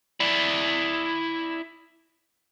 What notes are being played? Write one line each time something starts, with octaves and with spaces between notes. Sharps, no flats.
E4 D5